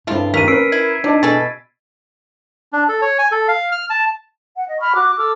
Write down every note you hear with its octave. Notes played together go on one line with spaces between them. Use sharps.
C#2 G2 A3 C4 E4 F4
D#2 A2 E3 A#3 B6 D#7
C#4 A#4 B4 E6 C7 D7
E4 G#6
B2 D4 D#4 D5 A5
B2 E3 G#4 A4 A6
D4
A4
C#5
G#5
A4
F5
F6
A5
F#5
D#5
B5 C#6 F6
F#4 D6 F#6
A4 D6 E6 F6